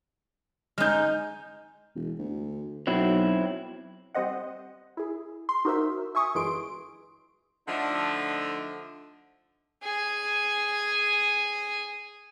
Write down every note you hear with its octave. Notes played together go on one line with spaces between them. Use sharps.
G#3 D#4 F6 G6
E1
D2
B1 F#3 C4 E4
G3 C4 C5 D#5 F#5
E4 G#4
C6
D#4 F#4 A#4 C5 E5
E5 G#5 C#6 D#6
G1 F#2 E3 G#3 C6 D7
D3 F3 A3 D4 D#4
G#4 G#5